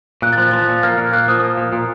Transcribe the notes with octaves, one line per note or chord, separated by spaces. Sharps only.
A#2 F#6
A6
F3 F#6
F3 A6
F#6
A#2
A#3 F6
A#2
A#3 F#6
F3 D#6
A#3
A#2
A#2